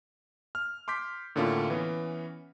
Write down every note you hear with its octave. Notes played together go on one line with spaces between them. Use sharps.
F6
C6 D6 G6 B6
A2 D3 A#3 C#4 F4
E3 B3 C#4